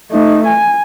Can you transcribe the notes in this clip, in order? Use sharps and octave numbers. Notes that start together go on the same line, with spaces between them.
A3 D#4
G#5